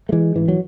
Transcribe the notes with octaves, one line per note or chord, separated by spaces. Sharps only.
A3
E3 G#3
A1 G#2 E3
F#3